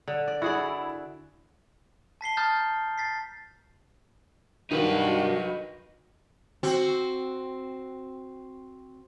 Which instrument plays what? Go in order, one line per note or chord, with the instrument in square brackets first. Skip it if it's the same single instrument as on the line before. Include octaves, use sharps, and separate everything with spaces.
[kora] D3
D5
[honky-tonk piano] E4 [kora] F#4 G#4 D5
[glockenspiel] A5 B6 C7 G7
A5 A#5 D#6 F6 G6 A6
A6 B6 C7
[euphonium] G2 [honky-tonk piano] D#3 [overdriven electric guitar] D#4 B4 [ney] F#4
[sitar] C4 F#4